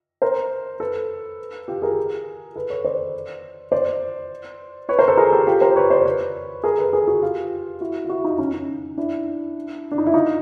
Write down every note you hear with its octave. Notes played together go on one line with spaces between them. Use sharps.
A#4 C5
A4 B4
F4 G4
G#4 A#4
A4 B4
B4 C#5
C5 D5
C5 D5
B4 C#5
A#4 C5
A4 B4
G#4 A#4
G4 A4
F4 G4
A#4 C5
B4 C#5
C5 D5
B4 C#5
G#4 A#4
A4 B4
G#4 A#4
F#4 G#4
F4 G4
E4 F#4
F4
E4 F#4
D#4 F4
C#4 D#4
C#4 D#4
D4 E4
D4
D#4
E4
D#4 F4